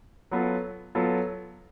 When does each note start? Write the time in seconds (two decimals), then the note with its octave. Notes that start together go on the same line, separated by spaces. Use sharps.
0.31 F#3 B3 F4 A4
0.95 F#3 B3 F4 A4